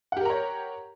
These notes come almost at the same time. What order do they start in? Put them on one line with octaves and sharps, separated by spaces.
F#5 G4 A#4 A#5 C#5